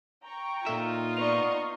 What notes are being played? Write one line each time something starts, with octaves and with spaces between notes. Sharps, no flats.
G5 A#5 C#6
A#2 D#4 F4 A4 E5
B3 D5 D#5 C#6 F7